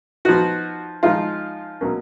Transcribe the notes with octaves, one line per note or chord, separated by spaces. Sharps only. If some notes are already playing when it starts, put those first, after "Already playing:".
F3 B3 D#4 F#4
F3 G#3 D#4 F4
B2 F#3 A#3 C#4